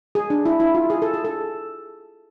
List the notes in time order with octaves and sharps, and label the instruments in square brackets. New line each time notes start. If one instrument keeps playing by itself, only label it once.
[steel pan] G#4
D4
E4
E4
F4
G#4
A4
G#4
A4